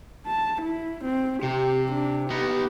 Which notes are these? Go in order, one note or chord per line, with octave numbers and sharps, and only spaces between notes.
A5
E4
C4
C3 G4
D4
B3 D#4 G4